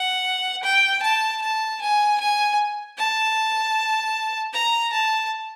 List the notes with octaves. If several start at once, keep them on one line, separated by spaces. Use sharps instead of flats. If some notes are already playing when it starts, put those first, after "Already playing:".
Already playing: F#5
G5
A5
A5
G#5
G#5
A5
A#5
A5